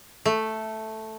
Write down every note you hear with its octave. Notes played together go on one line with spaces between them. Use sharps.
A3